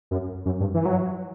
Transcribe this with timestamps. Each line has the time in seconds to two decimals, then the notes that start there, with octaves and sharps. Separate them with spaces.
0.11 F#2
0.45 F#2
0.60 G2
0.74 E3
0.85 F#3